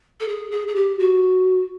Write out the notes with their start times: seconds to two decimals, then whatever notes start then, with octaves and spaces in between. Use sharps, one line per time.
0.20 A4
0.28 G#4
0.51 G#4
0.68 G#4
0.75 G4
0.99 F#4